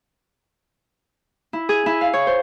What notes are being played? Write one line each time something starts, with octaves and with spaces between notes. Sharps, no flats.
E4
G#4
E4
F5
C#5
C5